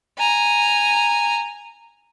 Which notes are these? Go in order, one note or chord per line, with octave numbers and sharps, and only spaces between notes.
G#5 A#5